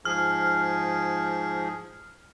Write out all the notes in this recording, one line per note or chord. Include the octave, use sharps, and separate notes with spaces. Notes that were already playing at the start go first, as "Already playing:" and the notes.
G#2 F3 G#4 F6